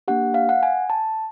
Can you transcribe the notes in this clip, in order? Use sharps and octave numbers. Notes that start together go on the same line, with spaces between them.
A#3 D4 G4 F#5
F5
F#5
G#5
A5